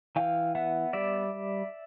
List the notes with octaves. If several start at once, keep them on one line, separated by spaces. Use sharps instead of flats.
E3 F5 G5
B3 E5 F#5
G3 D5 E5